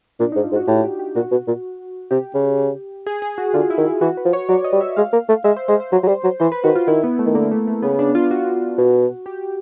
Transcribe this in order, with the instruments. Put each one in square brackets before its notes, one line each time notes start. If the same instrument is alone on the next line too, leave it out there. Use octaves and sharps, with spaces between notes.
[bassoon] A#2 [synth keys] D4
[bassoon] G#2 [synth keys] D#4
[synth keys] F4
[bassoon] G#2
[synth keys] F#4
[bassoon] A2 [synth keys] G4
[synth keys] G4
G4
[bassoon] A#2 [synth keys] F#4
[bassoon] B2
A#2
[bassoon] C3 [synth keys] G4
[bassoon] C#3
[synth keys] G#4
G#4
F#4
[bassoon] D3 [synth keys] F4
[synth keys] E4
[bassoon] D#3
[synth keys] E4
[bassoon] E3 [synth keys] F#4
[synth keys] B4
[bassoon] F3
[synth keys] C#5
[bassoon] F#3 [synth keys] D5
[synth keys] D#5
[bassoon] G3
[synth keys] E5
[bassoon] G#3 [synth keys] F5
[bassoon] A#3
A3
[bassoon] G#3 [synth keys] E5
[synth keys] C5
[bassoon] G#3 [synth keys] C5
[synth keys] C5
[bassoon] F#3 [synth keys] C5
[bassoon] F#3
[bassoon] G3 [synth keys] C5
[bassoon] F#3 [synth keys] C5
[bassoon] E3 [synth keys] C5
[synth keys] B4
[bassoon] D#3 [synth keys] F#4
[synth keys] F4
[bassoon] D#3 [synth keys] E4
[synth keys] B3
A3
[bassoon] D#3
[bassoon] D3 [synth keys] A#3
[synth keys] A3
A3
[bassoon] C#3 [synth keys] B3
[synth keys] D4
F4
F#4
[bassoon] B2
[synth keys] G4